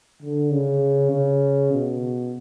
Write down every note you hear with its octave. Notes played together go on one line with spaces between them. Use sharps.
D3
C#3
C#3
B2